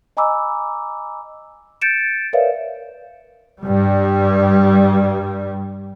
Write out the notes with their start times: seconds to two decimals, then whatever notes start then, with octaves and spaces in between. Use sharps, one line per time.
0.17 D#5 G#5 A#5 B5 D6 E6
1.81 G6 A6 C#7 D7 E7
2.33 A#4 B4 C#5 D5 E5 F5
3.62 G2 G3